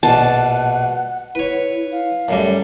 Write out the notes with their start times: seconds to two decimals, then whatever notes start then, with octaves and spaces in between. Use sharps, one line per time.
0.03 A#1 B2 F#5 A5
1.35 E4 B4 C#5
1.91 F5
2.28 F#2 A2 G3